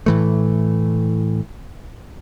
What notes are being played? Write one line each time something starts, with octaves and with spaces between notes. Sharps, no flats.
A2 E3 A3